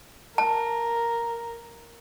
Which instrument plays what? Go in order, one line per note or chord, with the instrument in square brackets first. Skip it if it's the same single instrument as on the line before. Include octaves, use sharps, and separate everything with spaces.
[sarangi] A#4 [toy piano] A5